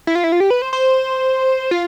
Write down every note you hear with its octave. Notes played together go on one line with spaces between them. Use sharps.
E4
F4
E4
F4
G4
B4
C5
C5
F4